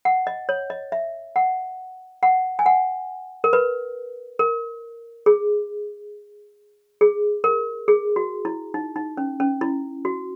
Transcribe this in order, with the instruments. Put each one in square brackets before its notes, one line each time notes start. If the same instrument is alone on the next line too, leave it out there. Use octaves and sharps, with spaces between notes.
[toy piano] F#5
D#5
C#5
D#5
E5
F#5
F#5
G#5
F#5
A#4
B4
A#4
G#4
G#4
A#4
G#4
F#4
E4
D#4
D#4
C#4
C#4
E4
F#4